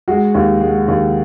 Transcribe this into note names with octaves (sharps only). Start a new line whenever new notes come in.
G#3 F#4
D#2
G#3
D#2